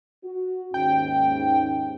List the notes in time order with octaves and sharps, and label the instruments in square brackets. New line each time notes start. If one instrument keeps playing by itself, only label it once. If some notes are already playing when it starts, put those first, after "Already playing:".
[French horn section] F#4
[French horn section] D#2 G#2 C#4 [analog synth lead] G5